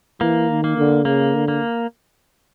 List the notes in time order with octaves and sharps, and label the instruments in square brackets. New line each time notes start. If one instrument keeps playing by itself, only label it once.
[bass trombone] E3 [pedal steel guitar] A#3
[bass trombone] D#3
[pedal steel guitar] A#3
[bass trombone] D3
[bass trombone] C#3 [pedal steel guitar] A#3
[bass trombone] D3
[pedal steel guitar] A#3